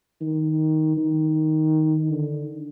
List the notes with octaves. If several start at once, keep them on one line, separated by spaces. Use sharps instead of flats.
D#3
D#3
D3